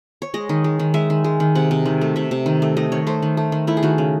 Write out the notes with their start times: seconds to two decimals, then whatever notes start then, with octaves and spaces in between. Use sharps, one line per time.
0.22 C#5
0.34 G#3 D#5
0.49 D#3
0.64 G#3
0.79 D#3
0.94 G#3 E5
1.10 D#3
1.24 G#3
1.40 D#3
1.55 C3 F#5
1.71 C3
1.86 D#3
2.01 A3
2.16 C3 E5
2.31 C3
2.46 D#3
2.62 A3
2.77 A3 D#5
2.92 D#3 C#5
3.07 A3 C5
3.22 D#3
3.37 A3
3.52 D#3
3.67 A3 E4
3.77 G#4
3.83 D#3 F#4
3.98 C#3